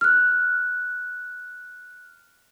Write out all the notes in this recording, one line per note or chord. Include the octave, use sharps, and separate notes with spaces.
F6 F#6